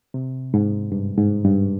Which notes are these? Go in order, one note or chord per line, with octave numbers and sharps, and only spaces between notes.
C3
G#2
G2
G#2
G2